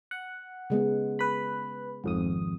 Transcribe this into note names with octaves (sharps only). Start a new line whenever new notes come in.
F#5
C#3 G#3 B3
B4 B5
G#1 F2 D#6